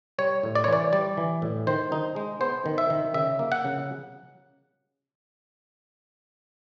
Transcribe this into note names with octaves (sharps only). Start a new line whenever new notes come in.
G3 C#5
A2
D5
C#5
E3 D5
G3 D5
E3
A2
D#3 C5
D#4
G#3
B3 C5
D#3
E5
D#3
C#3 E5
A#3
F#5
C#3